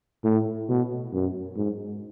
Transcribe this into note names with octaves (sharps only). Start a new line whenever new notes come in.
A2
B2
F#2
G#2